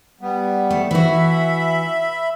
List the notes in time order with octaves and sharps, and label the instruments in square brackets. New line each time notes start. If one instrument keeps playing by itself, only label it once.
[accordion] G3 B3
[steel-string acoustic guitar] A3
[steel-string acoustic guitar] E3 F#4 [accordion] E5 B5